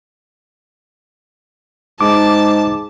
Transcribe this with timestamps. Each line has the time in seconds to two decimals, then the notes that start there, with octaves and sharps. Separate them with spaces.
2.01 G#2 A5 D6